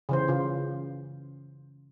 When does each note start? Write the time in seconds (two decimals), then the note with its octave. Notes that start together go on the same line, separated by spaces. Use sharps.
0.09 C#3 E3 C5
0.28 C#3 F4